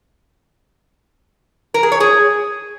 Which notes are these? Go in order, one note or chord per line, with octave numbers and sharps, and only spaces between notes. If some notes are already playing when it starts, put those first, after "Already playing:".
A#4
G#4
C#5
G#4